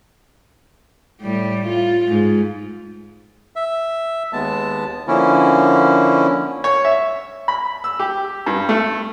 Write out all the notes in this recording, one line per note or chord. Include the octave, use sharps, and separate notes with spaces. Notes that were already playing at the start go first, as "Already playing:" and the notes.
A2 G3
F4
G#2
E5
D#2 G#3 B3 A5
D3 F3 A#3 C#4 E4
C#5
E5
B5
E6
G4
G2
A3